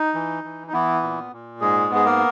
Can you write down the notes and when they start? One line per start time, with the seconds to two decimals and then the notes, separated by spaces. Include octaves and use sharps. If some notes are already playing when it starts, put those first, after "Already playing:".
Already playing: D#4
0.14 E3
0.44 E3
0.67 D#4
0.73 E3 B3 E4
1.03 A#2
1.32 A#2
1.61 G#2 G#3 G#4
1.90 B3
1.95 G#4
2.05 A#3 A#4